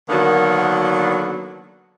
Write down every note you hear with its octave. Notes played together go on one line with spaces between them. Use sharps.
D3 D#3 F#3 A#3 B3